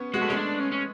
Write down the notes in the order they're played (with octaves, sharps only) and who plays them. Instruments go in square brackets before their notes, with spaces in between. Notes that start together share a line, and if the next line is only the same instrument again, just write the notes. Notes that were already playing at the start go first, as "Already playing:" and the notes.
Already playing: [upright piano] B3 C#4
[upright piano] G#3 [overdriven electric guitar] F#4
[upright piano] A3
[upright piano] G#3 [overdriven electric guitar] C#4
[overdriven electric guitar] D4
C#4
C#4